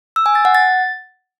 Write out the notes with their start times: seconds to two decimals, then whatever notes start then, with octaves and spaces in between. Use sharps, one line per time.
0.16 E6
0.26 G#5
0.35 A6
0.45 F#5
0.55 A6